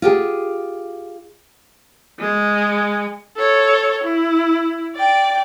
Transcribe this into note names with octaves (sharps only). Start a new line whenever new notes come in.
F4 G4 G#4
G#3
A4 C#5
E4
D5 G5